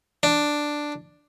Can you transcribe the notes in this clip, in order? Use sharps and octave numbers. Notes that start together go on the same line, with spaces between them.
D4